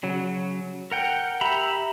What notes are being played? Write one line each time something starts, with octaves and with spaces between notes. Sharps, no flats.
C#3 F#3
A#4 F#5 G5
G4 E5 A#5 B5